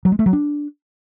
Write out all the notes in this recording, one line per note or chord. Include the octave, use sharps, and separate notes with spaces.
F#3
G#3
A3
F#3
D4